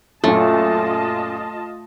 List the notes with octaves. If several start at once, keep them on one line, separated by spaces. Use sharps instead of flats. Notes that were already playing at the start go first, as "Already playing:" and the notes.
F#2 A#2 A3 F4 D#5 A5